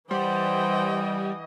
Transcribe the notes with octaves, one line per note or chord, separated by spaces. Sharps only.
E3 G3 C5 D#5 F#5 G5